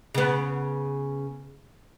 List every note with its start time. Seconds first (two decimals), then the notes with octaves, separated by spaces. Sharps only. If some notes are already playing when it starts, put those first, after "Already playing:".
0.15 C#3 B3